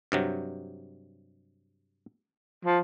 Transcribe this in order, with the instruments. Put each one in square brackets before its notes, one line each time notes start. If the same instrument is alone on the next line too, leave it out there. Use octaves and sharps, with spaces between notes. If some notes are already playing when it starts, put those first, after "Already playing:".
[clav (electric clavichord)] G2 C3 F#3
[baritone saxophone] F3